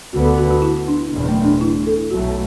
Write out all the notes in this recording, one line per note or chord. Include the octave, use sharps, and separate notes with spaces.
D2 D3 B3 F#4
A4
F#4
F#4
E4
D4
F#1 E2 B2
A3
D4
E4
A4
B1 B2 F#3 A3 F#4